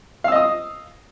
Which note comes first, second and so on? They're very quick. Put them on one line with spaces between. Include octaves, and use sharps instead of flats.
F5 E6 D#5 D#6